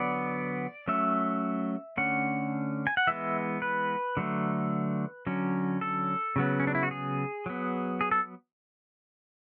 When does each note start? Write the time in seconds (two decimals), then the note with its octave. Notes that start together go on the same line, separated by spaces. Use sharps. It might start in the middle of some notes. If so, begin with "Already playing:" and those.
Already playing: D3 F#3 B3 D5
0.88 F#3 A3 C#4 E5
1.97 D3 A3 C#4 F#5
2.87 G#5
2.97 F#5
3.07 E3 G#3 B3 E5
3.62 B4
4.17 D3 F#3 A3
5.27 D3 F#3 C#4
5.81 A4
6.36 C#3 F#3 B3
6.60 C#4
6.67 D4
6.75 E4
6.83 F#4
6.91 G#4
7.46 F#3 B3
8.01 G#4
8.11 A4